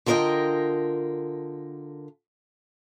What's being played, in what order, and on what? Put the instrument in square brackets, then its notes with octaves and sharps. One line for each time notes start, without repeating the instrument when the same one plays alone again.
[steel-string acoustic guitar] D3 F4 A#4 B4 D#5 G5